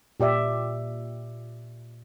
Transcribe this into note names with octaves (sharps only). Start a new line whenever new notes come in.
A#2 G4 D5 E5